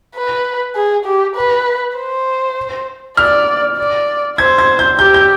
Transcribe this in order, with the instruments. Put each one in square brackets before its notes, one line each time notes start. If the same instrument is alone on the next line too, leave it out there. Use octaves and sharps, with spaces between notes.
[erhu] B4
G#4
G4
B4
C5
[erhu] D5 [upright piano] F6
[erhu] D5
[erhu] C5 [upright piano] G#6
[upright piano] G#6
G6
[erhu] G4 [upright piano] G6
[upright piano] G6